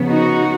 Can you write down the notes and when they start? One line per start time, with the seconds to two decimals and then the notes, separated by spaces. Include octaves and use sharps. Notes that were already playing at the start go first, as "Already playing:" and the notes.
Already playing: C#3 F3 B3
0.09 D#4 F#4